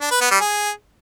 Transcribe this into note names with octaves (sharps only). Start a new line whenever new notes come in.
D4
B4
B3
G3
G#4